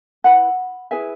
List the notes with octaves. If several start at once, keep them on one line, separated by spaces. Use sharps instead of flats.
E4 B4 F#5 B5
E4 G#4 B4 E5 G#5